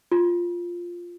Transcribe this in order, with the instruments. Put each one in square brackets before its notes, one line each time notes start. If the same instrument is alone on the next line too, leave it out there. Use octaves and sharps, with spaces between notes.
[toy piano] F4